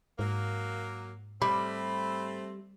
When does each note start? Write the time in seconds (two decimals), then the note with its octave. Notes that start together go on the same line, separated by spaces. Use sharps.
0.19 G#2 F#3 A#3
1.42 G3 A3 C4 B5